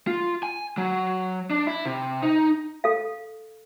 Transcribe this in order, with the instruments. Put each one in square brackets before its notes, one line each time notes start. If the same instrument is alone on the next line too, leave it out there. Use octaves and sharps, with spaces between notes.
[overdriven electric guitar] F4
G#5
F#3
D4
E4
C3
D#4
[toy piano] A4 F5